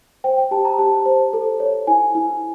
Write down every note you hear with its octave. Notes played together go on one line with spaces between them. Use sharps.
C5 G5
G5
G4 A5
A#5
G4 A5
C5
A4
C#5
E4 G#5
E4